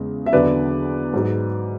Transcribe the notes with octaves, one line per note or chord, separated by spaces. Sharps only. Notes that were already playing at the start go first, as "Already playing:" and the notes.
Already playing: E2 C#3 G#3
E5
E2 D3 F#3 B4 D5
G#2 F#3